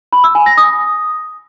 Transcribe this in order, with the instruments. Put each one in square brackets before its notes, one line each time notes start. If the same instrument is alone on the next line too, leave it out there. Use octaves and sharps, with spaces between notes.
[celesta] B5
E6
G#5
A#6
D#6